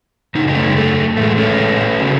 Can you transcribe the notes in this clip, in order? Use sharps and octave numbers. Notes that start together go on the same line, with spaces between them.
F#2 C#3 D#4
D#4
A3 C#4
G#3
A3
A2 E3 G#3 A3
A3 C#4
C#3 F#3